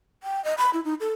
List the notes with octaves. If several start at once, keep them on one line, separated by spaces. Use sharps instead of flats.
G5
D#5
B5
E4
D#4
A4